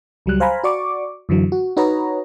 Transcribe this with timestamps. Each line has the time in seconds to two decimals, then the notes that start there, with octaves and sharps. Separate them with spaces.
0.26 C#2 F#3 G3 F#6
0.40 C5 F5 G#5 A#5 B5
0.64 F#4 D5 C#6 D6
1.29 F#2 D3 E3 F#3
1.52 F#4
1.77 D#4 F#4 B4 C#5 D#5 A#5